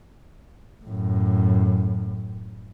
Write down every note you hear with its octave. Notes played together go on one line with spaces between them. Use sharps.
F#2 A2